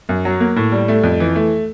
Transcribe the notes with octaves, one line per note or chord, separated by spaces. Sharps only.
F#2
F#3
A#3
A2
G3
A3
F2
E3
A3